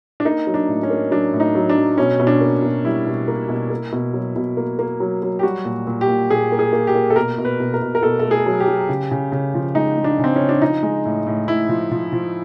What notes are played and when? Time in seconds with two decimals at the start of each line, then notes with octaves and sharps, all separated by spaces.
0.20 D4
0.25 A#3 D#4
0.47 F#3
0.54 D4
0.68 A2
0.83 C#4
0.90 A#3
1.11 F#3 D4
1.33 A2
1.40 D#4
1.55 F#3
1.70 D4
1.77 F#3
1.97 B2 C#4
2.20 B2
2.27 D4
2.41 A#3
2.62 B2
2.84 G3 E4
3.06 B2
3.28 A#3
3.49 B2
3.70 A#3
3.92 B2
4.14 F#3
4.36 B2
4.57 A#3
4.79 A#3
5.00 F#3
5.22 F#3
5.39 G4
5.43 G3 F#4
5.65 A#2
5.87 A#2
6.01 G4
6.08 A#2
6.30 A#2 G#4
6.52 A#3
6.59 G#4
6.73 A#3
6.87 G4
6.95 A#3
7.10 A4
7.16 B2 A#4
7.38 B2
7.45 B4
7.60 B2
7.74 A#4
7.82 B2
7.95 A#4
8.02 B2 A4
8.19 A3 A4
8.31 G#4
8.46 F#3
8.60 G4
8.68 F#3
8.89 C#3
9.11 C#3
9.32 C#3
9.54 F3
9.75 G#3 D#4
9.97 G#3
10.04 D4
10.19 C#3
10.24 C4
10.36 C#3 C#4
10.49 D4
10.62 F3 D#4
10.83 G#3
11.05 A2
11.27 A2
11.48 A2 E4
11.69 F3
11.91 F3
12.13 F3